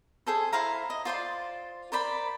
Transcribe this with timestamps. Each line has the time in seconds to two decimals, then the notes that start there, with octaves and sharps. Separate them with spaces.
0.27 G#4 A4 C5
0.53 E4 C5 F5 A#5
0.90 D#5
1.05 F4 C5 D5 C6
1.92 A#4 C5 D5 B5